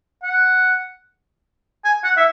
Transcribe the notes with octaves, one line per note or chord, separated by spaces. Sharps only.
F#5
G#5
F#5
E5